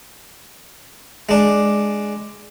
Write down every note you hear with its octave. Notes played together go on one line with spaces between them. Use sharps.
G#3 D4